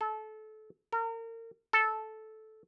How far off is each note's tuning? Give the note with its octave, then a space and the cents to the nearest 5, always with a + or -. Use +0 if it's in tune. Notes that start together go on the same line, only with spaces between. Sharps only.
A4 -25
A#4 -35
A4 -10